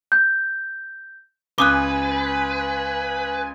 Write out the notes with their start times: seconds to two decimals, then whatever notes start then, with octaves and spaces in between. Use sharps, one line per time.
0.12 G6
1.58 C#2 B4 G#5 D6 D#6 F#6